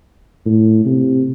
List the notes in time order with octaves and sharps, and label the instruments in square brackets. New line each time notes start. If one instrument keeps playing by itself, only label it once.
[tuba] A2
C3